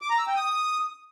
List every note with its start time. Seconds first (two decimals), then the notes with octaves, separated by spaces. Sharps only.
0.02 D6
0.10 A#5
0.18 E6
0.27 G5
0.35 D#6